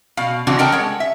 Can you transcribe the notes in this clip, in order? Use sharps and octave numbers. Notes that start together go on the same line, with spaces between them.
B2 F5
C#3 E3 C4 D4 F#4
A4 A#4 D#5 F#5 G5 A5
G#3 C#5
E5